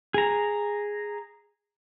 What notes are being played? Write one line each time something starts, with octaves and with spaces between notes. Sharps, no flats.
G#4 A#5